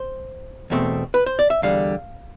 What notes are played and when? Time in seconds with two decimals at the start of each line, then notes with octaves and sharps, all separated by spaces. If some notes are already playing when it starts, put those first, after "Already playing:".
Already playing: C5
0.70 E2 B2 A3 C4
1.14 B4
1.26 C5
1.39 D5
1.50 E5
1.62 E2 D3 G3 F5